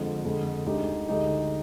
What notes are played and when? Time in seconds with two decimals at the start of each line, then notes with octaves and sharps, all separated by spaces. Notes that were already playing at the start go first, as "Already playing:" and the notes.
Already playing: F2 D3 F3 G#3
0.25 F2 D3 G#3
0.66 D2 D3 G#3 D#4 G4
1.08 D2 D3 G#3 D#4 G4